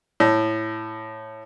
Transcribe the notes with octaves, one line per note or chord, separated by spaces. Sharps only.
A2